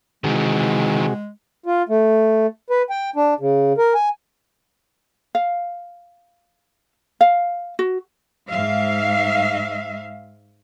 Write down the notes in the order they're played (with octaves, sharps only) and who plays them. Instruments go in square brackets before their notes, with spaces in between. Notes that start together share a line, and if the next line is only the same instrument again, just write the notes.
[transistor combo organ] C3 F#4 G#4 [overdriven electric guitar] D#3 E3 [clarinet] G#3
[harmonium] F4
A3
B4
G5
D4
C#3
A#4
G#5
[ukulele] F5
F5
F#4
[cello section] G#2 E5 F5